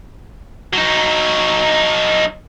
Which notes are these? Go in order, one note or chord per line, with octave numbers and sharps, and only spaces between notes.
F#3 D#4